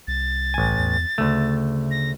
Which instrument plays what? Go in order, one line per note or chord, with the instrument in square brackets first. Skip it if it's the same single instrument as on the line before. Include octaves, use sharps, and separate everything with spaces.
[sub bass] C2 [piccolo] A6
[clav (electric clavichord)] A1 G#5
[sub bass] E2
[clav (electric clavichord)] D2 A3 [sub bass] C#3
[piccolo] A#6